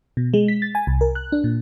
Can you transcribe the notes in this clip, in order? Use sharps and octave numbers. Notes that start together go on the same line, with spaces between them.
B2
G#3
B6
A6
G#5
C2
A#4
F#6
D4
A#2